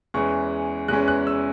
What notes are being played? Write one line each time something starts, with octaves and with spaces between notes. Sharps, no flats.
E2 E3 G#3 C#4 C#6
E2 E3 G#3 C#4 F#6
F#6
E6